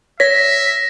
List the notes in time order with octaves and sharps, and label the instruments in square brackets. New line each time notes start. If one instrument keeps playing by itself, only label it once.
[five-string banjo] C#5 [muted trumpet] E5 [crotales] A#6 [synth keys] B6